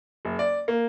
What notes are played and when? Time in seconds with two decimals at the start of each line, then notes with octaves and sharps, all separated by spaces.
0.25 F#1
0.39 D5
0.68 A#3